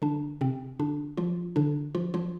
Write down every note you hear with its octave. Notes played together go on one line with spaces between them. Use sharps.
D3 D4
C3 C4
D3 D4
F3 F4
D3 D4
F3 F4
F3 F4